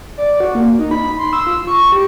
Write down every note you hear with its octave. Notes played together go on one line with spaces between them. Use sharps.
D5
F#4
A#3
D#4
B5
C6
E6
F4
C#6
G4